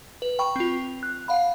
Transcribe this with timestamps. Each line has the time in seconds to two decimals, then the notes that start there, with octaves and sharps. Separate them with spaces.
0.22 B4
0.39 G5 B5 C#6
0.56 C4 F4
1.03 F#6
1.28 F5 F#5 B5